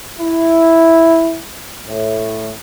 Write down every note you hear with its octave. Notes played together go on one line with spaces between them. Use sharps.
E4
A2